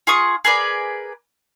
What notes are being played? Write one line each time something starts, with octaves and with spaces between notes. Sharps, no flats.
F4 G#4 C#6 D#6
G#4 A#4 B4 D5